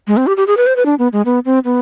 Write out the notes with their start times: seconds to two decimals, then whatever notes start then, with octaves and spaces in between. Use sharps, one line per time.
0.07 G#3
0.17 C4
0.27 G4
0.37 G4
0.47 G#4
0.57 B4
0.67 C5
0.76 B4
0.86 D4
0.99 B3
1.13 G#3
1.25 B3
1.45 C4
1.65 B3